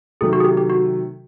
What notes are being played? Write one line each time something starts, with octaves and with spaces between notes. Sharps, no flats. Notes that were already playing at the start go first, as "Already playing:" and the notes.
C3 D#3 F#3 A3 G#4
F#4
G#4
G4
G4
F#4